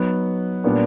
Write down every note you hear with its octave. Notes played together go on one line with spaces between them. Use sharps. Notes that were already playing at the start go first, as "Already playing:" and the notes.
Already playing: F#3 B3 D#4
A#2 G3 B3 D4